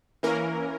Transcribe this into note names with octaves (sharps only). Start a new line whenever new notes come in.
E3 A#3 C#4 A#4